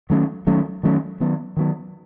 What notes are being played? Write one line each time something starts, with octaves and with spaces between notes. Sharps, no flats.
D#3 F#3 A3 C#4
D#3 F#3 A3 C#4
D#3 F#3 A3 C#4
D#3 F#3 B3
D#3 F#3 B3